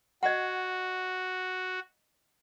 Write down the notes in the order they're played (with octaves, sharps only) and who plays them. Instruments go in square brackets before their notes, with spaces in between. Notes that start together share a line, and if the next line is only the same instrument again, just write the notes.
[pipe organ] F#4 [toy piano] D#5 F#5